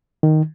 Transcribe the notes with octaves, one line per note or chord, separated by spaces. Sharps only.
D#3